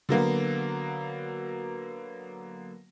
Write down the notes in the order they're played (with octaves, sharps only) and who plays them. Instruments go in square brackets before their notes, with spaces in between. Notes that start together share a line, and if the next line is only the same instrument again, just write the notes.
[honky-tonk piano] D3 F#3 A#3 B3